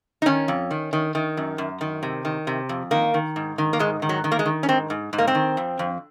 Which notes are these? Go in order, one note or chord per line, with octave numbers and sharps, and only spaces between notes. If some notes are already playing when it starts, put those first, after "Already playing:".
D#4
D#3 C#4
F2
D#3
D#3
D#3
F#2
F#2
D#3
C3
D#3
C3
F2
D#3 A#3
D#3
G#2
D#3
A#3
G#2 G#3
D#3
F#3
D#3
A#3
G#3
D#3
C#4
G#2 C4
G#2
G#2
A#3
C4
D#3
F2
F2